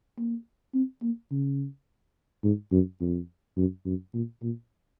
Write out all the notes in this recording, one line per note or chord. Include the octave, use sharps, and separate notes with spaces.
A#3
C4
A#3
C#3
G#2
F#2
F2
F#2
F#2
A#2
A#2